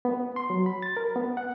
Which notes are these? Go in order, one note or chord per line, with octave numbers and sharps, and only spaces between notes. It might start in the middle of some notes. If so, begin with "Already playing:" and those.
B3
C6
F#3
B5
A6
A#4
B3
F#5